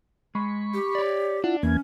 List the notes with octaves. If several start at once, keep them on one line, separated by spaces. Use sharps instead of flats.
G#3 B5 C#6
G4
C#5 D5
D4 E4 F4 F#5
E2 E3 A#3 C#4 G#6